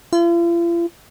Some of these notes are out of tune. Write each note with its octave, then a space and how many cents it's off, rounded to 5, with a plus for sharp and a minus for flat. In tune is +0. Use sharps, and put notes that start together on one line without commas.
F4 -45